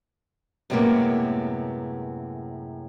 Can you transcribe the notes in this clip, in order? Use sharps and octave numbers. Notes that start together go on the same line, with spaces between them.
F#2 A2 C3 G#3 A#3 B3